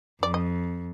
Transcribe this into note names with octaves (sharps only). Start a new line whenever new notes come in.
F2 D5
D#5